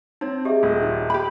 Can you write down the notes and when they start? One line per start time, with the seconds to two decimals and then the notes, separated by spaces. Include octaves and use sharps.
0.21 C4 D#4 C#5
0.45 G4 G#4 D#5 E5
0.63 D#1
0.83 D#4
1.10 G4 B5